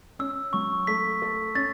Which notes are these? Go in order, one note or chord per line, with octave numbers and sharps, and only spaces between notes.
C#4 E6
F#3 C#6
A3 B6
A4
C#4 A6